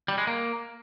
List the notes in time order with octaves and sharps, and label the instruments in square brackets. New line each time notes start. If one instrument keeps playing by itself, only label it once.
[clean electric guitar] G3
G#3
A#3